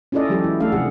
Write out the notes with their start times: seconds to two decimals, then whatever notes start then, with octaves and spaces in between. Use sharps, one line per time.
0.12 C#4 E4 F4 A4 D5 D#5
0.29 E3 F#3 G#3 G4 A4
0.44 E4
0.60 A3 D4 A4 F5
0.72 C3 F3 G#4 F#5